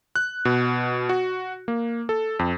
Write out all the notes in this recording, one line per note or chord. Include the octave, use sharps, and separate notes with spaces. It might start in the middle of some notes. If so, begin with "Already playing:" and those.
F#6
B2
F#4
A#3
A4
F2